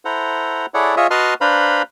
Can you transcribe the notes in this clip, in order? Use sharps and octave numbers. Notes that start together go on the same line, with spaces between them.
E4 A4 C5 F#5 A#5
E4 G#4 A4 C#5 D5 F#5
F4 G#4 C#5 D#5 E5
F#4 B4 D#5 A5 C6 F6
D4 B4 C5 F5 A#5 B5